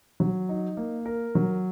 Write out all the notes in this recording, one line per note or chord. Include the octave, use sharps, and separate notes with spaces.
F#3
D#4
A#3
A#4
F#3